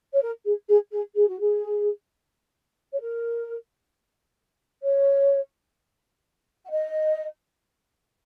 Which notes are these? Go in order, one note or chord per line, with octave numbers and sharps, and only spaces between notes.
C#5
A#4
G#4
G#4
G#4
G#4
F#4
G#4
C#5
A#4
C#5
F#5
D#5